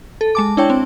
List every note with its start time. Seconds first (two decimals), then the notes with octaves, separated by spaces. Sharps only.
0.21 A4
0.35 G#3 A5 D6
0.57 D4 E4 C#5 G5 A5
0.70 C4